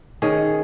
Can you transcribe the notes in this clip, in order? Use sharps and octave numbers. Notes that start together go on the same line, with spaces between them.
D#3 C#4 G#4